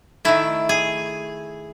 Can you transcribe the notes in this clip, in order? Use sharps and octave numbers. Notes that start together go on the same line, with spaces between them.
D#3 A3 E4
G#4